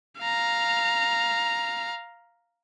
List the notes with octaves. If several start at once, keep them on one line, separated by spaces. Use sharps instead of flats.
F5 A#5